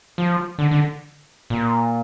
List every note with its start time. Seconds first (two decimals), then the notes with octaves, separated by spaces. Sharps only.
0.18 F3
0.58 D3
0.71 D3
1.50 A#2